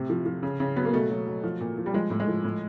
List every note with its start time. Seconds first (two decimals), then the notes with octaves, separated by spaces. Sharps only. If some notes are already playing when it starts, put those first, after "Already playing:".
Already playing: A2 C3
0.10 F3
0.26 F3
0.43 C#3
0.60 C#3
0.76 F#3 B3
0.85 A#3
0.93 B2 A3
1.10 F#3
1.27 F#3
1.44 F3
1.60 A#2
1.78 F3
1.86 G3
1.94 F3 G#3
2.10 A2
2.20 G#3
2.27 F3
2.44 A2